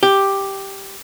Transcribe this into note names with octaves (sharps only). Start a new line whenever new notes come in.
G4